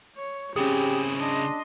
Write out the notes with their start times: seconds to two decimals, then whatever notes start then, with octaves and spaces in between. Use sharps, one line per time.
0.17 C#5
0.56 C#3 C4 C#4 E4 G4 G#4
1.18 D4 D#5 C6